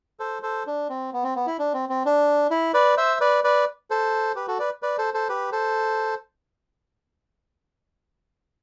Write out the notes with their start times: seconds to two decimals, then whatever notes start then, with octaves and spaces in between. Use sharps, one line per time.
0.20 A4 C5
0.42 A4 C5
0.67 D4
0.89 C4
1.13 B3
1.24 C4
1.36 B3
1.47 E4
1.59 D4
1.74 C4
1.89 C4
2.06 D4
2.51 E4
2.74 B4 D5
2.97 C5 E5
3.20 B4 D5
3.44 B4 D5
3.90 A4 C5
4.36 G4 B4
4.47 F#4 A4
4.59 B4 D5
4.82 B4 D5
4.98 A4 C5
5.14 A4 C5
5.29 G4 B4
5.52 A4 C5